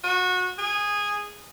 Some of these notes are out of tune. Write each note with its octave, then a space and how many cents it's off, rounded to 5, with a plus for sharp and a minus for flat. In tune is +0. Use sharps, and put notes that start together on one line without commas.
F#4 -25
G#4 -10